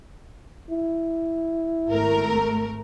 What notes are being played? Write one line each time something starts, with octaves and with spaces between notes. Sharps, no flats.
E4
G#1 A3 A#4